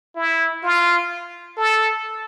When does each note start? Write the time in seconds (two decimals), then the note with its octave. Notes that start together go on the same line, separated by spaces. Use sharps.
0.16 E4
0.63 F4
1.57 A4